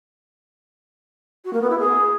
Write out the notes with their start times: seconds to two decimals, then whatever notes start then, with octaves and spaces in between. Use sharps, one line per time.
1.45 F#4
1.53 A#3
1.62 B3
1.70 E4
1.78 G#4